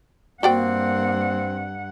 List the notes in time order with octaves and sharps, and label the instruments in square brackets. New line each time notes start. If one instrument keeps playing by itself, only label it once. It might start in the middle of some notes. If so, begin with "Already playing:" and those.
[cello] G2 F#5 [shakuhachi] A#3 [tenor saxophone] C4 [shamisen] F#4 D5 G5